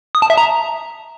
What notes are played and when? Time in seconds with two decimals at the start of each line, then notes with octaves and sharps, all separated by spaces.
0.15 D#6
0.22 A5
0.30 E5
0.37 A#5